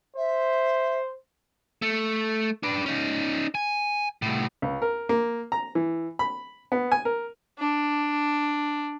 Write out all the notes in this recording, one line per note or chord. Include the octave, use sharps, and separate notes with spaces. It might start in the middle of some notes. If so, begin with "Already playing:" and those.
C5 E5
A3
D4 B4
C#4 D#4
G#5
C2 A2
C#2
A#4
A#3
A#5
E3
B5
B3
G#5
A#4
D4